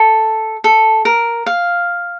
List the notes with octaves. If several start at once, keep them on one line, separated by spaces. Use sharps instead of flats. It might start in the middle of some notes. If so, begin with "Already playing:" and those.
Already playing: A4
A4
A#4
F5